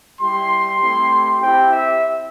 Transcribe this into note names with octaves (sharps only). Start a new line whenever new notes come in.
G3 E4 G4 C6
A3 C4 E4 G4
C4 E4 G4 G5
E5